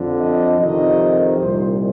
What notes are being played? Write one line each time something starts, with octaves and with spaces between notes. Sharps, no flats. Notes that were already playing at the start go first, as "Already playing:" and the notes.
Already playing: F2 D3
D#5
F2 C3 D#3 D#5
C2 A#2 C5